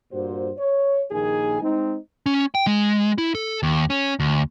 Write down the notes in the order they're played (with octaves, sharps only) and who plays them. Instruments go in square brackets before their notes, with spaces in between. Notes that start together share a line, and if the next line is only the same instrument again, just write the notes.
[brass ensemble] G2 A#2 F#4 C5
C#5
A#1 D#2 D#3 G#4 G#5
G#3 C4 D#4
[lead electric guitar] C#4
G5
G#3
E4
A4
D#2
C#4
D2